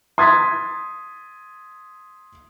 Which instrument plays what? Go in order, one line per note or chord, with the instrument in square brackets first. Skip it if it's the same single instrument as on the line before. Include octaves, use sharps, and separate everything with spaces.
[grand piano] C6 D#6 G#6 A6 B6